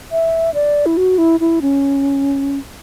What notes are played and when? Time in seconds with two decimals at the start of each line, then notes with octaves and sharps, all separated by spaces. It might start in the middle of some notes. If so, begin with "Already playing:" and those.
0.12 E5
0.54 D5
0.86 E4
0.97 F#4
1.18 E4
1.40 E4
1.62 C#4